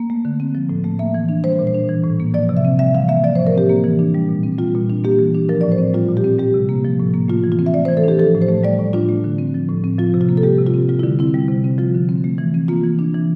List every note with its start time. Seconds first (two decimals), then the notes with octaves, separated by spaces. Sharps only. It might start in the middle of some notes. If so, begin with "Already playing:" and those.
Already playing: A#3
0.10 A3
0.25 D3
0.40 C4
0.55 F3
0.69 A2
0.84 A3
0.99 A#3 E5
1.14 E3
1.29 D4
1.44 G3 C5
1.59 A#2
1.67 C5
1.75 D4
1.89 E3
2.04 A2
2.20 A#3
2.34 F3 D5
2.49 C3
2.57 E5
2.65 C4
2.79 G3 E5
2.95 E3 F5
3.09 A#3 E5
3.24 F3 D5
3.35 C5
3.39 A2
3.47 A#4
3.55 C4 G4
3.70 A#3
3.84 E3
3.99 D4
4.15 G3
4.29 A#2
4.43 C4
4.58 G3 F4
4.75 A#2
4.90 D4
5.04 A#3 G4
5.19 E3
5.35 D4
5.49 F3 A#4
5.61 A2 D5
5.72 C5
5.78 C4
5.94 G3 F4
6.09 A#2
6.17 G4
6.24 C4
6.39 G3 G4
6.54 C3
6.69 A#3
6.85 F3
7.00 A2
7.14 A#3
7.28 A3 F4
7.44 E3
7.52 F4
7.59 C4
7.66 E5
7.74 A3 D5
7.85 C5
7.88 E3
7.97 A4
8.04 D4 G4
8.19 F3 A4
8.34 A2
8.42 C5
8.49 A3
8.64 G3 D5
8.79 A2
8.93 D4 F4
9.09 A3
9.24 D3
9.38 C4
9.54 F3
9.69 A2
9.84 C4
9.99 F3 F4
10.14 C3
10.21 F4
10.29 A#3
10.37 A4
10.43 G3 G4
10.59 C3
10.67 F4
10.74 C4
10.89 G3 F4
10.99 D3 E4
11.19 C4 E4
11.34 G3
11.49 C3
11.64 C4
11.78 F3 F4
11.94 D3
12.09 C4
12.24 A3
12.38 E3
12.54 C4
12.68 A#3 F4
12.84 E3
12.99 D4
13.14 E3